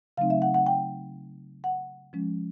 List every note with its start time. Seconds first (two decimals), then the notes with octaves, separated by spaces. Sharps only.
0.17 C#3 F#3 A3 C4 D#4 F5
0.30 E5
0.42 F#5
0.54 F#5
0.66 G5
1.64 F#5
2.13 F3 G#3 C#4